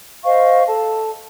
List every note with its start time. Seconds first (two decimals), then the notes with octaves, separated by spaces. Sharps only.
0.25 C5 D#5 F5 C#6
0.67 A4 A5